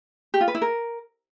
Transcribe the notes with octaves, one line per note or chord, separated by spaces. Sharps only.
G4
F4
B4
E4
A#4